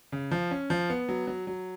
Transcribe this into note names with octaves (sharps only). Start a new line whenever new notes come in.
C#3
F3
C#4
F3
B3
F#3
F#3
F#3